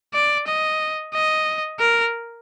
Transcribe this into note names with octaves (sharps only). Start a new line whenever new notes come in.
D5
D#5
D#5
A#4